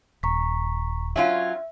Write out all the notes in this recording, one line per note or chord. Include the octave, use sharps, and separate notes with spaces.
D#1 A#5 C#6 B6
F#3 C#4 F4 E5